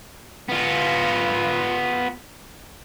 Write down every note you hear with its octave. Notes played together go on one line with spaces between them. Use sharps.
B3 F4